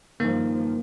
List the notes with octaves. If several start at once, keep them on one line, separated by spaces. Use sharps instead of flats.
F#1 G2 D#3 F3 A#3